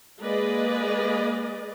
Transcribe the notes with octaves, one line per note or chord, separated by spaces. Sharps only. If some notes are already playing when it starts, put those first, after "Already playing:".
G#3 A#3 G#4 B4 D5 D#5